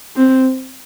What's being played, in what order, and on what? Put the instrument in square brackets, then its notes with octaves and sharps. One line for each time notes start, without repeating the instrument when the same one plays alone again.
[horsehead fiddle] C4